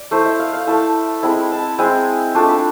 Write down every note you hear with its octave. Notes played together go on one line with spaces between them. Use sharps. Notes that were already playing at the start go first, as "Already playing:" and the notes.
Already playing: D5
A3 E4 C5
E5
F5
F5
A3 E4 A5
G#3 C4 E4 B5
A5
G#3 C4 E4 G#5
A3 D4 F4 A5
B5